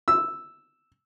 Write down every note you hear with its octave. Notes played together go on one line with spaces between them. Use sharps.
E6